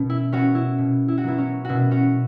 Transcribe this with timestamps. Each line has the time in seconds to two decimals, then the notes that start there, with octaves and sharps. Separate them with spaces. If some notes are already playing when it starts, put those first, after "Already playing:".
Already playing: B2 B3 C#4
0.10 E4
0.32 B3 C#4 F#4
0.55 E4
0.78 B2
1.08 E4
1.18 F#4
1.24 F#3 B3 E4
1.38 C#4
1.65 B2 E4 F#4
1.91 C#4 F#4